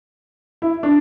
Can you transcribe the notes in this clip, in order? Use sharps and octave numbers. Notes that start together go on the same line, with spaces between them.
E4
D4